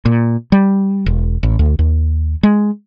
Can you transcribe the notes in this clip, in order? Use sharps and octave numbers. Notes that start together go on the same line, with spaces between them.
A#2
G3
E1
A1
D2
D#2
G#3